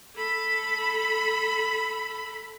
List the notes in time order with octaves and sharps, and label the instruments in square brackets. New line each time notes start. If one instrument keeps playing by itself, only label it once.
[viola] A4 B5